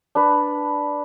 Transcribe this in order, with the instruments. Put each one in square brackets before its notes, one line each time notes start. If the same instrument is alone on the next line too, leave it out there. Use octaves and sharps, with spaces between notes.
[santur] D4 B4